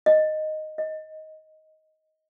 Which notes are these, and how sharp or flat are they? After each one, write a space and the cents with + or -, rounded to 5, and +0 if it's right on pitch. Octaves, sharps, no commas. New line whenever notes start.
D#5 -5
D#5 +10